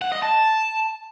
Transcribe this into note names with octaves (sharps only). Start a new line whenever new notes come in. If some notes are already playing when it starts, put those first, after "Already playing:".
F#5
D#5
A5